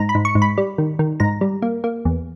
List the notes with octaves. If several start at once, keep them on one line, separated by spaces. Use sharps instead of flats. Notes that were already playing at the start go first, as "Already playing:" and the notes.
Already playing: G#2 A#5
B5
G#2
C#6
G#2
B5
G3
D#3
D#3
G#2 A#5
G3
A#3
A#3
E2